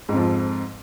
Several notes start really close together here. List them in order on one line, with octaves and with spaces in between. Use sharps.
G#2 F2 F3